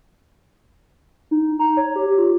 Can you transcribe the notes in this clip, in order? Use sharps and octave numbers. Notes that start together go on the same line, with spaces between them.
D#4
A#5
C#5
G4
F4